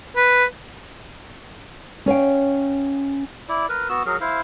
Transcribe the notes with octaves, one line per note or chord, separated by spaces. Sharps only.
B4
C#4 C#5 F5 G5
E4 D5
A#4 B4
B3 F#4 E6
F#3 G#4 A#4
E4 C5 F5